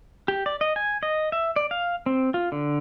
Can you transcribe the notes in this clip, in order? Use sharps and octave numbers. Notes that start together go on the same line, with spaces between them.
G4
D5
D#5
G#5
D#5
E5
D5
F5
C4
F4
D3